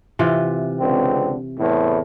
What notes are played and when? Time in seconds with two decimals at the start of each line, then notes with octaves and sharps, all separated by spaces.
0.19 C3 E3 F4
0.78 C#2 D3 C4
1.59 E2 A2